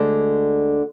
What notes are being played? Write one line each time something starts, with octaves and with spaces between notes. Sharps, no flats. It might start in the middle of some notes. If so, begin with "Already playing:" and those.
Already playing: D2 D3 G#3 D4